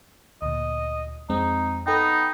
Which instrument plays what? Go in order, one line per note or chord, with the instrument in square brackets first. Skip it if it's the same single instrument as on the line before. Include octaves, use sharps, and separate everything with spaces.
[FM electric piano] D2 A#2 [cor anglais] D#5
[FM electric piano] F2 G#3 C4 [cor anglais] D#4
[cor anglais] B3 [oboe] D#4 [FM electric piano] A4 G5